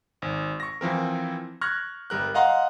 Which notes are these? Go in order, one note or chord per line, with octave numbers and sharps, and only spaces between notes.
G#1
C#6 A#6
E3 F3 C4 A#4
C#6 F6 F#6 G#6 A#6
G1 G3 A#4 F#6
D#5 F5 F#5 A#5 C6